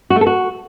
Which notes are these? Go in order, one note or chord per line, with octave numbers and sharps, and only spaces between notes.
F#4
A3
A4
F#4